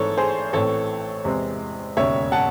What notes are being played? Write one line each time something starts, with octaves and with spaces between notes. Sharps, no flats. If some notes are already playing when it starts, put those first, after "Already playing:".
Already playing: G#1 G#2 E3 A3 C4 A4 C#5
G#4 C5
A1 A2 E3 C4 A4 C#5
E2 C3 E3 G#3 C4
E1 D#2 C#3 C#5 E5
F#5 A5